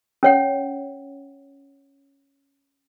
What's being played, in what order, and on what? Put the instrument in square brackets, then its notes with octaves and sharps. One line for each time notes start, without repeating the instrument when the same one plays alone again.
[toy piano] C#4 C#5 F#5